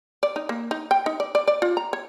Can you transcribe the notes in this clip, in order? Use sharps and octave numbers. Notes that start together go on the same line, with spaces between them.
D5
D#4
A#3
D#4
G5
D#4
D5
D5
D5
F4
A#5
C#5